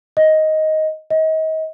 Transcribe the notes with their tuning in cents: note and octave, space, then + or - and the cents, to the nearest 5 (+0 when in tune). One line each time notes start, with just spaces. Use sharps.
D#5 +10
D#5 +35